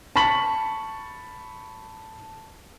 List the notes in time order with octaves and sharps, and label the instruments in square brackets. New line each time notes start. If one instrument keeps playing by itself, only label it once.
[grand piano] A5 B5 C#6 B6 F#7